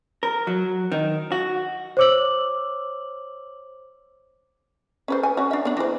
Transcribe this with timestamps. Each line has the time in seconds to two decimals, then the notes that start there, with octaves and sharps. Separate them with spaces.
0.23 A#4
0.47 F#3
0.92 D#3
1.32 F#4
1.97 C5 C#5 D6 E6 F#7
5.08 C#4 B4 C5
5.23 G#5
5.37 C#4 F#4
5.51 D4 E5
5.65 B3 D4
5.77 E3 C5